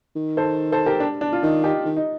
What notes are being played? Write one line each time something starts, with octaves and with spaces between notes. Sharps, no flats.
D#3
A4 C5
A4 C5
G4 A#4
D4
D4
F4
D#3 D#4
D#4 G4
D#3
D#4